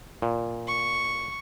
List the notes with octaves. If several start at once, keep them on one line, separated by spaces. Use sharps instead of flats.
A#2
C#6